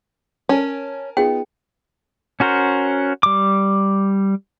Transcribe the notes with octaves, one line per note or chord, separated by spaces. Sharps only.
C#4 A#4 G#5 A5
B3 D#4 F4 G#4 G5
C#4 F#4 A#4 C5
G3 D6